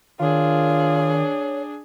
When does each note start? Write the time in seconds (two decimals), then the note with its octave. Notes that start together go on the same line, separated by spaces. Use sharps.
0.20 D#3 D4 F4 G#4 C#5